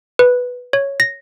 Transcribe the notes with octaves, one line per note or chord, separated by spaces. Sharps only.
B4
C#5
A#6